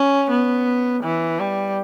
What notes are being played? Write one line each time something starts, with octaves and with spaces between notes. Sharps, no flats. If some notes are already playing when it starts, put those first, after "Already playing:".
Already playing: C#4
B3
E3
G3